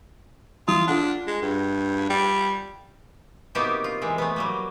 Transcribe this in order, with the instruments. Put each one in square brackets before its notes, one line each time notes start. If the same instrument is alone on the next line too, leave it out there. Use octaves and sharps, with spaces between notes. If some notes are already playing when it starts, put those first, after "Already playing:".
[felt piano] E3 D#6 [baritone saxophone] F4
[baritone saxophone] D4 [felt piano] F4 A4 F#5
[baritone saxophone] G#3
G2
G3
[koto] C3 A#3 B3 D#4 F#4 G4
F4
E3 G#3 C4
A3 B3
F#3 G3 A#3